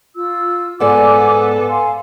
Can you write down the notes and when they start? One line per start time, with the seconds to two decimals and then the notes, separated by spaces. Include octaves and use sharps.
0.16 F4 E6
0.80 G#2 B3 A4 D5 G#5 D6
1.68 F5 G#5 C6